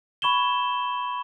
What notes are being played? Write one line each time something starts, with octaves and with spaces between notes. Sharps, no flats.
B5 C#6 G#6 E7 G7